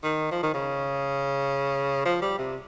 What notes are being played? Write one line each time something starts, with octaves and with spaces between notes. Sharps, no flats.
D#3
F3
D#3
C#3
F3
G3
C3